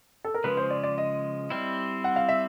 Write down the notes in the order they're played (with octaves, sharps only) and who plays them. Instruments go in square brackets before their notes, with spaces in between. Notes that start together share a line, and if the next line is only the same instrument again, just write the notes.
[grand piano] A4
A#4
[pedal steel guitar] C#3 F3 G#3 [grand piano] B4
[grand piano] C5
D5
D5
D#5
[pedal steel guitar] G3 C4 E4
[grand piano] F#5
F5
E5